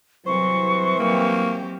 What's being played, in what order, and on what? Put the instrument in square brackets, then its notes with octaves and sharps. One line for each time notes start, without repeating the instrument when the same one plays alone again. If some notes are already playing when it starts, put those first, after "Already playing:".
[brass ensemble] C2 E3 [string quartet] F#3 [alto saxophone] C5 [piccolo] C#6
[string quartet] F#3 C4 G4 [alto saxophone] A#3